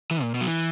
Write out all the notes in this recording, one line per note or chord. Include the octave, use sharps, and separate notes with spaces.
E3
A#2
B2
F#3
E3